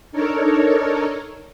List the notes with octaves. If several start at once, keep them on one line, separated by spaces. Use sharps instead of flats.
D4 D#4 A4 A#4 C#5